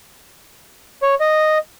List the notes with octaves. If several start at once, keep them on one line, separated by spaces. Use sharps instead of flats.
C#5
D#5